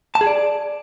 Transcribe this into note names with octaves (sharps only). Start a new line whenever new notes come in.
A5
G#4
D5